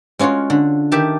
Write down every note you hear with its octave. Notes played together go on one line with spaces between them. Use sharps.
G#3 C#4 F4 F#4 C#5
D3
D#3 G4 E5 A5